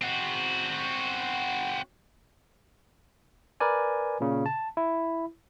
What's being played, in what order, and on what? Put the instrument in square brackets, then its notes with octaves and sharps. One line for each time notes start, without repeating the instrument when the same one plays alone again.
[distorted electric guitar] C4 F#4
[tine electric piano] A#4 B4 D5 G#5
A#2 C#3
A5
E4